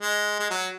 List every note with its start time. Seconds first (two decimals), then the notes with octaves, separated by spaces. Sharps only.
0.01 G#3
0.40 G#3
0.50 F#3